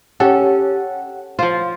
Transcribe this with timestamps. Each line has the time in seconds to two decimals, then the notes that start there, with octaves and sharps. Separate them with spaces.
0.20 C#4 G4 A4 F#5
1.39 F3 F4 C5